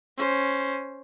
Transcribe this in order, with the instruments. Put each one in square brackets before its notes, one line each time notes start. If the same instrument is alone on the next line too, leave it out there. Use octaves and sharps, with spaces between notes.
[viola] C#4 C5